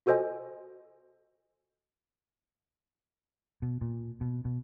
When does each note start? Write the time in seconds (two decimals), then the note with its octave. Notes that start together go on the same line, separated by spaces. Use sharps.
0.06 F4 F#4 A4 C5 D#5 G#5
3.62 B2
3.81 A#2
4.21 B2
4.45 B2